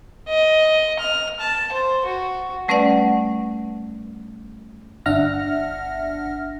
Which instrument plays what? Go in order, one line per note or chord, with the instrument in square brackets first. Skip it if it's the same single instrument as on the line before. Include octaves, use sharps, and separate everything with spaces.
[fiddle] D#5
F6
A5
C5
F#4
[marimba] G3 A3 C#4 B4 D5 F#5
[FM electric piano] G1 D4 E5 F#5 F6 A#6